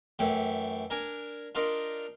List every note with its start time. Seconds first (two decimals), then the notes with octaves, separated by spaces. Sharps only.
0.19 F#2 E3 A3 G5
0.90 D4 A#4 G#5
1.55 D4 D#4 F4 A#4 D5